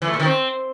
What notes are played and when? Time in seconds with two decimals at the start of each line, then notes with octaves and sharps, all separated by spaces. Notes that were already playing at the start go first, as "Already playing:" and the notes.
0.02 E3
0.08 A3
0.14 A#2
0.20 D#3
0.25 C4